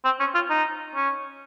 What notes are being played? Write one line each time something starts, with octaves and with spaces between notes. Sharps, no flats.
C4
C#4
F4
D#4
C#4